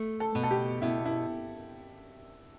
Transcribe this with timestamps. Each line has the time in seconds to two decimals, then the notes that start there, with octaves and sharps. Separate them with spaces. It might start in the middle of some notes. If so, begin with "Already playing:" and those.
Already playing: A3
0.20 A4
0.35 B2
0.43 A4
0.51 G4
0.82 B2 E4
1.05 E4